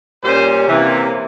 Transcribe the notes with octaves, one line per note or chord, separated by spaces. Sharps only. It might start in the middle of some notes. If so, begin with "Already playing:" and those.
A#2 G3 C#4 C5
C3 E3 A#3